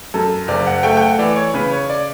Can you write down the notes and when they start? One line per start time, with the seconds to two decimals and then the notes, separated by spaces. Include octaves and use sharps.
0.14 F#2 A4
0.48 F#1 D5
0.67 F#5
0.83 A3 G5
0.97 G5
1.01 F#5
1.19 E3 D5
1.36 C#5
1.54 C#3 B4
1.71 C#5
1.90 D5